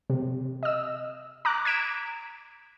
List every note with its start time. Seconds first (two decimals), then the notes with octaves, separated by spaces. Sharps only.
0.10 C3
0.63 D#5 E6
1.45 A#5 D6 F#6
1.65 G#6 B6 D7 E7